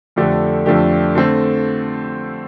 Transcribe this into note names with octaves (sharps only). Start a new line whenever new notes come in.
F2 D3 A3 D4 G4
F2 D3 A3 D4 G4
D3 A3 C4